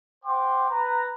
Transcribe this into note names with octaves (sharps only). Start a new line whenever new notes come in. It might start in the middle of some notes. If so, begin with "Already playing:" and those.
C5 F#5 G5 C6 D6
B4 A#5